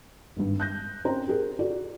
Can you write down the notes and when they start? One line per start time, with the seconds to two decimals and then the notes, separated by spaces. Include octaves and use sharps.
0.36 G#1 G2
0.60 F#6 G6 A#6
1.05 C4 C#4 G4 A#4 C5 A#5
1.28 G4 G#4 A#4
1.59 F4 F#4 A4 D5